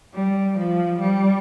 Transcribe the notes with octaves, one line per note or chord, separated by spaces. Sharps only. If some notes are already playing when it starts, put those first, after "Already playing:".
G3
F3
G3